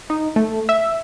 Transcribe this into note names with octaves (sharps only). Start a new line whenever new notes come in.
D#4
A3
E5